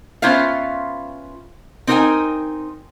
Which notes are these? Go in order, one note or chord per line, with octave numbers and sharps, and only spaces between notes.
B3 C#4 F4 C5 E5 F5
C4 D#4 A#4 C5 G5 G#5